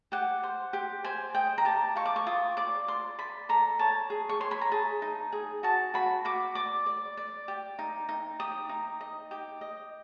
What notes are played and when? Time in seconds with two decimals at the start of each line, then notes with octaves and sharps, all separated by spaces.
0.12 G4 F#5
0.43 C5
0.73 G4
1.04 C5 G#5
1.35 D#5 G5
1.58 A#5
1.65 G4 A5
1.96 F4 C#6
2.05 D6
2.16 C#6
2.26 F4 D#6
2.57 D5 D6
2.88 D5 C6
3.19 D5 B5
3.49 A4 A#5
3.79 C#5 A5
4.10 G#4
4.29 C#6
4.40 C#5 C6
4.51 B5
4.61 A#5
4.72 G#4 A5
5.02 D#4
5.32 G#4
5.63 F#4 A5
5.94 F#4 B5
6.25 F#4 D6
6.55 D5 D6
6.86 D5
7.17 D5
7.48 G4
7.79 D#4
8.09 D#4
8.39 G4 D#6
8.69 D#4
9.01 D#5
9.31 G4
9.61 D#5